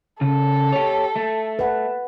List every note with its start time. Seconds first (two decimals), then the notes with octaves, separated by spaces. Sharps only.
0.21 C#3 A4
0.73 G4 C#5
1.16 A3
1.59 B4 F#5